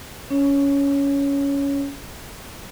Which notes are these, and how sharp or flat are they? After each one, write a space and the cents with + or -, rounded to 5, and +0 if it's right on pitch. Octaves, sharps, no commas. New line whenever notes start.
C#4 +20 C#5 +0